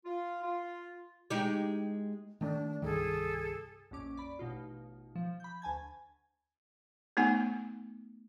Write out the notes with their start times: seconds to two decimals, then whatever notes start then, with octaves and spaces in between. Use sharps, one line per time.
0.05 F4
0.43 F4
1.30 G#3 D#4 G4
2.41 D#3 A3 D4
2.82 C2 G2 D#3 G#4 A4
3.91 A#1 F2 C#4 D6
4.17 D5 B5
4.39 A1 B2 D#4 F4
5.15 F3
5.40 B5 G6
5.62 D2 G#5 A5 G#6
7.17 A3 B3 D#4 F#5 G#5